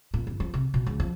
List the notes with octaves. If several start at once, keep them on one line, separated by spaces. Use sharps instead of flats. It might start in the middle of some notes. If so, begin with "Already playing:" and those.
A#2
G1
F3
C3
B2
C#2
F3